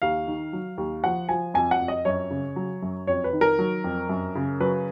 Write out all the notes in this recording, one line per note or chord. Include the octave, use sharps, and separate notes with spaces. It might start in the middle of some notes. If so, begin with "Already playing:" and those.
D#2 F5
D#3
F#3
D#2
F3 F#5
F3 G#5
F2 G#5
F#5
F2
D#5
F#2 C#5
C#3
F#3
F#2
F2 C#5
B4
D#3
A#4
F#3
F2
F#2
C#3
F#3 B4